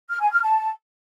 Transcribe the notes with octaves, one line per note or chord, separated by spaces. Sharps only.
F6
G#5
F6
A5